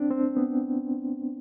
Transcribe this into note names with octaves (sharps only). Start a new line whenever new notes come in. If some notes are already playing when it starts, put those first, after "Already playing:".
Already playing: C4 D4
C4
B3